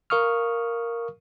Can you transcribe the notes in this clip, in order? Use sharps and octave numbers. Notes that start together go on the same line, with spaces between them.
A#4 F5 C#6 D#6 F6